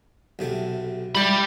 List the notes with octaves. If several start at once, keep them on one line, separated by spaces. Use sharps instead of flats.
B1 C3 A3
G3 E4 G4 B5